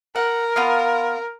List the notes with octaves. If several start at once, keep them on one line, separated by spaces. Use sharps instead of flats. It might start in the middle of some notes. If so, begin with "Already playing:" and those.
A#4 F#5
B3 F4 F5